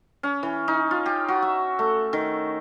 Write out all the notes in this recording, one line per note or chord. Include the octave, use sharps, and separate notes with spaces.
C#4
E3
D#4
F4
G4
F#4
E5
A3
D#3